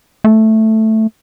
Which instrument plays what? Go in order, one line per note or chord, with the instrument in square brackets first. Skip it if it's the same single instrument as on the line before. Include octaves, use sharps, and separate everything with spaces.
[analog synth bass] A3